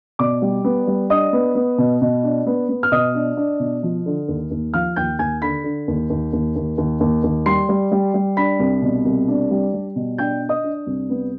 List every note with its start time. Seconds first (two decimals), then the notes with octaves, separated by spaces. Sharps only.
0.19 B2 D5 D6
0.42 G3
0.64 B3
0.87 G3
1.10 D4 D#5 D#6
1.33 B3
1.55 B3
1.78 B2
2.02 B2
2.24 D4
2.46 B3
2.69 B3
2.83 F6
2.92 B2 D#5 D#6
3.15 D4
3.37 D4
3.60 B2
3.83 F3
4.06 D3
4.28 D#2
4.51 D#2
4.74 F3 F5 F6
4.96 D#2 G5 G6
5.19 D#2 G#5 G#6
5.42 D3 B5 B6
5.64 D3
5.88 D#2
6.10 D#2
6.33 D#2
6.56 D#2
6.78 D#2
7.00 D#2
7.24 D#2
7.46 G3 C6 C7
7.69 G3
7.92 G3
8.14 G3
8.37 D4 B5 B6
8.60 C2
8.82 B2
9.05 C2
9.28 D4
9.51 G3
9.74 G3
9.96 B2
10.18 D4 G5 G6
10.41 D4
10.49 D#5 D#6
10.64 D4
10.87 C2
11.10 B3